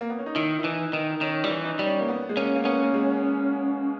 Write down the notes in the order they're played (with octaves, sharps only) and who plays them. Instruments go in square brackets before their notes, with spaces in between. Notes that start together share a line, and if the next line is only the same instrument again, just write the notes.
[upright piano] A#3
B3
C#4
D#4
[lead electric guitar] D#3 [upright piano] E4
[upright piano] E4
[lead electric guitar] E3 [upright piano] D#4
[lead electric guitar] D#3 [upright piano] D#4
[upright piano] D#4
[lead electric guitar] D#3 [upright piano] C#4
[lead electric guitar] G3 [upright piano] E4
[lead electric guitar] E3
[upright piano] D#4
[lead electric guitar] G3
[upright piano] C#4
A#3
B3
G#3
[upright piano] A#3 [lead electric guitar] C#4
[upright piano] A#3
[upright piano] B3 [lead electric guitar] C#4
[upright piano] A#3
G#3